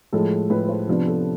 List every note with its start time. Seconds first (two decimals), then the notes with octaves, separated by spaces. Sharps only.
0.13 A2 F3 G#3 A4
0.50 A2 F3 G#3 B4
0.69 C5
0.88 C3 F3 B3 D4 B4
1.07 A4